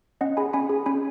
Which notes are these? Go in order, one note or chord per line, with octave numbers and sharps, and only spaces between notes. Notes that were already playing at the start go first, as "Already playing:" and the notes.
C#4 D#5 F#5
G#4 G#5 B5
C#4 G#5 B5
G#4
C#4 G#5 B5